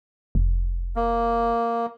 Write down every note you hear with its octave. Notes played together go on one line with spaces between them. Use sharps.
F1
A#3